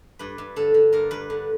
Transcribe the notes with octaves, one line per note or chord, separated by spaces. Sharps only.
G2 B4
G2
D3 A4
D3
G2 A#4
G2 B4
D3